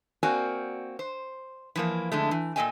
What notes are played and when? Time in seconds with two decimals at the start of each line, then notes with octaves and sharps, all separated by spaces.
0.23 A#3 C4 F#4 A#4 D5 G#5
0.99 C5
1.76 E3 F3 A#3
2.12 F2 D3 G#3 A3
2.31 E3
2.56 A#2 C4 A4 D#5 G5 G#5